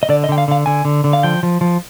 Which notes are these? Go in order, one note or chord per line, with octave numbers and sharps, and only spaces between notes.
D#5
D3 D5
D#5
D3 G5
F5
D3 F5
D3 G#5
D3
D3
F5
F3 G5
F3
F3